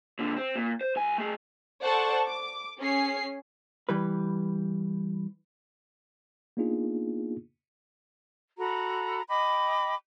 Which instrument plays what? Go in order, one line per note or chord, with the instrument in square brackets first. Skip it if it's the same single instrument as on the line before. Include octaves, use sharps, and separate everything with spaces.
[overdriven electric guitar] A#2 D3
C4
A#2
C5
C2 G#5
A3 G#4
[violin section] A4 C5 D5 F#5 A5 C#6
D6
C#4 G#4 C#5 C7
[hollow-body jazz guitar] E3 G3 B4
[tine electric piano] A#3 B3 D4 D#4 F4 G#4
[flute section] F#4 A4 A#5 B5
D#5 G5 B5 D6